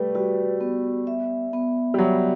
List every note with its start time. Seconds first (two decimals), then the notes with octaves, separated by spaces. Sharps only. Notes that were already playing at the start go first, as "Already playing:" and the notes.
Already playing: G3 A3 B4
0.15 G3 F#4
0.61 B3
1.07 E5
1.53 B3
1.94 G3
1.99 F#3 E5